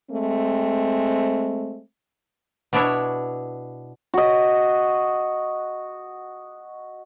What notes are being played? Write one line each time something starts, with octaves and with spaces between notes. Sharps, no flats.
G#3 A3 C4
B2 D4 E4 C#5
F#4 D#5